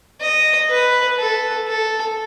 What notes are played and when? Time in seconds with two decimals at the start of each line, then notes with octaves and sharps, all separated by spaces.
0.21 D#5
0.70 B4
1.19 A4
1.68 A4